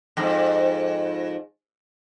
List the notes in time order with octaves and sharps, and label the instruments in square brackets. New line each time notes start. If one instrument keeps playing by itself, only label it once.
[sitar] F2 G#2